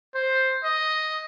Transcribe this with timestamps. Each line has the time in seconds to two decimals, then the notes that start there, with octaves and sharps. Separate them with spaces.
0.15 C5
0.64 D#5